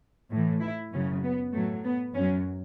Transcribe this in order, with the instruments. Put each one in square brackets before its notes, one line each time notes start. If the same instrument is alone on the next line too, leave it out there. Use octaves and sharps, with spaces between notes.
[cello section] A2 E3
E4
F#2 C#3 F#3 C#4
B3
A2 F#3 A3
B3
F#2 F#3 C#4